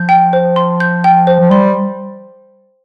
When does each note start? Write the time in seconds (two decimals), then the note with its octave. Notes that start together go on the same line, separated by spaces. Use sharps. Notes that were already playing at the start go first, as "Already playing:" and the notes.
Already playing: F3 G6
0.09 G5
0.33 C5
0.56 C6
0.80 G6
1.04 G5
1.27 C5
1.40 F3
1.50 G3 C6